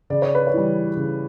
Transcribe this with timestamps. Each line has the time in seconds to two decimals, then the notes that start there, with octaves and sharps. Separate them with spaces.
0.10 C#3 D5
0.22 C#5
0.35 B4
0.47 C#5
0.54 E3 G3
0.97 C#3